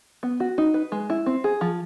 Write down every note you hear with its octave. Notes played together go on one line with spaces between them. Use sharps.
B3
F#4
D#4
B4
G#3
E4
C4
G#4
F3